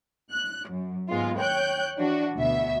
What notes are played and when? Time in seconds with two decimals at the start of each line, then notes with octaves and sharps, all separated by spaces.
0.31 F#6
0.69 F#2
1.09 D#2 G#2 G#3 B3 F4
1.38 C#5 G5 F#6 G6
1.98 E3 D4 F#4
2.35 D2 B2 E5